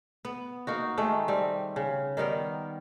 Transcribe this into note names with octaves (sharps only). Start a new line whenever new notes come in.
B3
A#3 D#4 F#4
D#3 G#3 A3 F#5
G3 C4
C#3
D#3 G3 B3 A#4